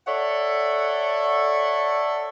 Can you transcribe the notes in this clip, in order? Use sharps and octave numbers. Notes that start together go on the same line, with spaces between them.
A4 C#5 D5 E5 F#5